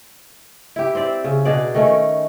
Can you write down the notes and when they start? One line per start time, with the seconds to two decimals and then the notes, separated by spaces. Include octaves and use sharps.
0.76 E4 G4
0.95 C4 C5 D5 E5
1.24 C#3
1.45 B2 D4 G#4 D5
1.74 D#3 A3 C#4